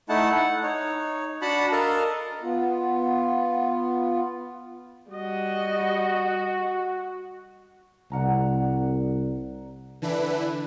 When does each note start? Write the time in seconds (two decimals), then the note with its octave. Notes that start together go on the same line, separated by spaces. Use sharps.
0.09 A3 D#4 E4 F#5 A5
0.30 F#5
0.63 D#4 C#5
1.42 D4 F#4 F#5 A5 B5
1.72 A4 A#4 D#5 F5
2.42 B3 F4
5.11 G3 F#4 D#5
8.12 C2 D5 F#5 A#5
10.02 D3 E3 D4 E4 B4